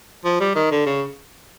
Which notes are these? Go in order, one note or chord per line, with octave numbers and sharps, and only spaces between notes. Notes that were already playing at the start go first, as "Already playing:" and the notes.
F3
G3
D#3
D3
C#3